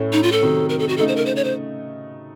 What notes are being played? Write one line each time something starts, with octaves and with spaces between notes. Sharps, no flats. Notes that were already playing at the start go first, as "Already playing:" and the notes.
Already playing: A2 A3 C#4
D#4
F4
A4
C3 D#3 F#3
A#4
A4
F#4
C#3 A3 D#4 A4
C5
A#4
C5
C#5
C5